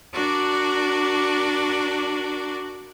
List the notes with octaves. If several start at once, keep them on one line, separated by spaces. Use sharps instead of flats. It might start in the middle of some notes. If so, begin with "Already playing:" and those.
D4 F#4 A#4 D5